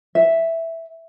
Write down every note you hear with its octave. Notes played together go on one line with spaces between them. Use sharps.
E5